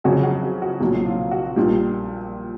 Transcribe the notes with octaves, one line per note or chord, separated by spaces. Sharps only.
F2 C#3 F#3 F#4 G#4
F#4
F#4
F#4
B1 A#2 F#3
F4
F#4
A#1 A#2 G3